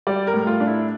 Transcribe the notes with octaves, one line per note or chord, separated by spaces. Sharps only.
G3 D5
A#4
A2
F4
D4
E4